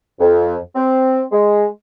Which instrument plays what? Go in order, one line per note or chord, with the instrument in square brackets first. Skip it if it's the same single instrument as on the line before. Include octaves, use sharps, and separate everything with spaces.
[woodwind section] F2
C4
G#3